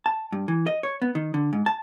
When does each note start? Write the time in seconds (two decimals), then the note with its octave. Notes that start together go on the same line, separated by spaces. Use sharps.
0.06 A5
0.32 G2
0.48 E3
0.67 D#5
0.83 C#5
1.02 B3
1.15 D#3
1.34 D3
1.53 G#2
1.66 A5